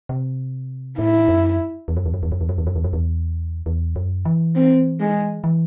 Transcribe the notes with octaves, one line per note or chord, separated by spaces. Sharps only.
C3
A2 E4
F#2
E2
F#2
E2
F#2
E2
F#2
E2
F#2
E2
F#2
E2
F#2
E2
E2
F#2
E3
C4
G#3
E3